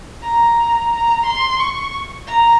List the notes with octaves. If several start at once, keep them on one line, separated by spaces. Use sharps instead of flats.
A#5
A#5
C6
C#6
A#5